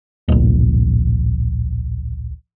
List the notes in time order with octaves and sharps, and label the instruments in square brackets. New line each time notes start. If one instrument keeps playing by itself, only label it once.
[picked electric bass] D1 A#1